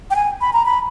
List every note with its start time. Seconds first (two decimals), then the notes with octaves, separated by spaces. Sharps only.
0.11 G5
0.16 G#5
0.41 B5
0.53 A#5
0.66 B5